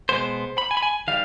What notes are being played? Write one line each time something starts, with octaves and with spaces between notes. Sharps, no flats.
B2 G#3 B3 C5
B5
G#5
B5
G#5
D#3 G3 F5